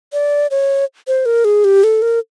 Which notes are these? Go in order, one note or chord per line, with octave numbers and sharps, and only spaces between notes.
D5
C#5
C5
A#4
G#4
G4
A4
A#4